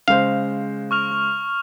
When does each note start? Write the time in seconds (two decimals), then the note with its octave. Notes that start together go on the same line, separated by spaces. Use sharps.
0.08 C#3 G#3 C5 F5
0.91 C#6 F6 F7